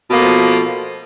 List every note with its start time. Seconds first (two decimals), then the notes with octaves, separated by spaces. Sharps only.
0.09 B2
0.12 A#3
0.15 A3
0.19 F3